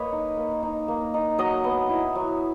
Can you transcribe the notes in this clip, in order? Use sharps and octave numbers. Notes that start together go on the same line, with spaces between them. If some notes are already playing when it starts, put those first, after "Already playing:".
Already playing: A#3 B4 C#5 D#5
D#4
A#3
D#4
A#3
D#4
F#3 D#5
B3
E4
F#3